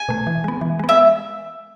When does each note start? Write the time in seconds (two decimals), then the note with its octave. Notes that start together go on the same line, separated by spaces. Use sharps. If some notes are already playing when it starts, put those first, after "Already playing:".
Already playing: G#5
0.09 B2 A3
0.27 E3
0.44 G#3 B3
0.61 E3
0.79 G#3 B3
0.89 E5